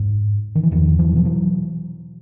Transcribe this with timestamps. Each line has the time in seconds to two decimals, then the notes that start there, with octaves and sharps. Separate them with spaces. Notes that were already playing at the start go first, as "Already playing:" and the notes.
Already playing: G#2
0.55 D#3
0.63 E3
0.71 E2 D#3 F3
0.99 E3 F#3
1.13 B2 F3
1.25 E3 F#3